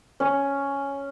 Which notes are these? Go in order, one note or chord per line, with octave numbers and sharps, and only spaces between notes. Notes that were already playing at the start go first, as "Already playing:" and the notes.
C#4